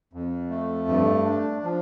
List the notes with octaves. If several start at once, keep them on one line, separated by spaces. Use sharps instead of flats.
F2
A3
G2
D4
F3